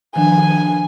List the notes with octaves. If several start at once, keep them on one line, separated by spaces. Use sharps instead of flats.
D#3 F3 D4 G#5